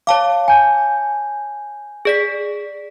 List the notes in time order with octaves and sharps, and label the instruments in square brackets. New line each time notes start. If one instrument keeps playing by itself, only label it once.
[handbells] C#5 A5 D6 [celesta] F5
[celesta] G#5 G6
[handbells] G#4 D5 B6